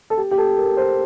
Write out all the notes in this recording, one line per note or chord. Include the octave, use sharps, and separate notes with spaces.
A4
G4
G4
A4
A#4
C5